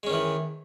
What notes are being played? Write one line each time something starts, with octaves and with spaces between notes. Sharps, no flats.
D#3 E3 G#3 C#4